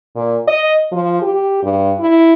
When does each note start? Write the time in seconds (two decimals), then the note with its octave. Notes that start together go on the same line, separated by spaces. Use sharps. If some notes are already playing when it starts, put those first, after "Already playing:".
0.15 A#2
0.47 D#5
0.92 F3
1.22 G4
1.63 G2
2.00 E4